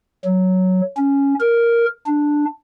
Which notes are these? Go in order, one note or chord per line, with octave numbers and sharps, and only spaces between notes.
F#3
C#4
A#4
D4